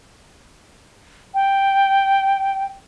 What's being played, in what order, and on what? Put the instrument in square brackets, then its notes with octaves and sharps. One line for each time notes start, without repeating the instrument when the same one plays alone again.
[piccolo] G5